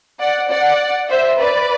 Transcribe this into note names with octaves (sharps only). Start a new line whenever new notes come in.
D5 F#5
D5 F#5
C5 E5
B4 D5